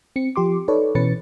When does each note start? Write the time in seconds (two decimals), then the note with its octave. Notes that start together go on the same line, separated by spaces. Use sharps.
0.16 C4 C#7
0.36 F3 G4 C6 D6
0.68 D#4 A4 B4 C#5 D5
0.95 B2 E3 C#4 B4 A6 C#7